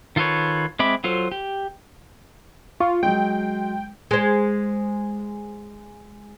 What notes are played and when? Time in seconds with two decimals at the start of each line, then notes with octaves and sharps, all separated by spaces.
0.16 D#3 F4 A4 B4 C#5
0.79 G#3 C4 E5 B5 D6
1.04 F#3 F4 A4 C5
1.32 G4
2.80 F4 C#6
3.03 F#3 G#3 G5
4.11 G#3 C5